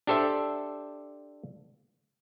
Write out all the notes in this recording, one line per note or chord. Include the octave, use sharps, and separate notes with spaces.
D4 G4 A4 C5 E5